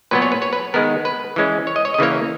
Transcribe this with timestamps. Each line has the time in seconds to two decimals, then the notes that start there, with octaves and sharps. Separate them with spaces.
0.11 A#2 F#3 B3 B4
0.22 C#5
0.32 B4
0.42 C#5
0.53 B4
0.74 D#3 G#3 B3 A#4
1.05 B4
1.36 E3 G#3 C#4
1.67 C#5
1.76 D#5
1.85 C#5
1.94 D#5
1.98 C#3 E3 A#3 C#5